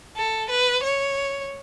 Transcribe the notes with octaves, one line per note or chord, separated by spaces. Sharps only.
A4
B4
C#5